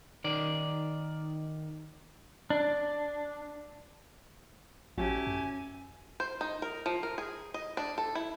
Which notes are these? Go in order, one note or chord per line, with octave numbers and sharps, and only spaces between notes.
D#3 D5
D4
A1 A3 C#4 E4 F#4 G4 G#5
F#2
C5
D#4
A#4
F3
A#4
G#4
D#5
D4
A4
E4